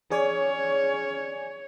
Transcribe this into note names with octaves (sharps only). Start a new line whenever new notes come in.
C#4 G#4 C#5 D5 G#5